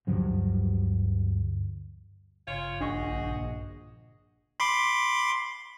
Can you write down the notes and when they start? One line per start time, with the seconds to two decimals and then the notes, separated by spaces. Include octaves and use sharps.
0.07 D2 G2 F3 F#3
2.47 G#1 G2 C#3 F4 C#5
2.81 A#1 D4 F#4 G#4 D#5 C#6
4.60 B5 C6 D6